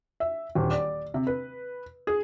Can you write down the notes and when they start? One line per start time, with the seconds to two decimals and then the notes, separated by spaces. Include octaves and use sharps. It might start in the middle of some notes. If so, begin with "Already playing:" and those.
0.20 E5
0.55 D#1
0.71 D5
1.14 C3
1.27 B4
2.07 G#4